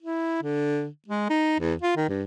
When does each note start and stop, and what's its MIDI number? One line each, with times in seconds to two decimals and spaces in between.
0.02 0.40 64
0.43 0.87 50
1.08 1.25 56
1.30 1.55 63
1.60 1.74 40
1.82 1.95 65
1.96 2.08 51
2.09 2.24 43